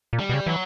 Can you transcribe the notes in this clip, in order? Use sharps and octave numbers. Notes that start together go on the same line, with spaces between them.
A#2
G3
B2
C#3
E3 F#3